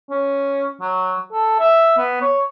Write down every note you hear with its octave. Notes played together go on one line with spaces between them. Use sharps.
C#4
F#3
A4
E5
B3
C#5